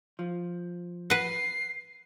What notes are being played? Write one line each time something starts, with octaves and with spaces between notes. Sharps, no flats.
F3
B4 F#5 C7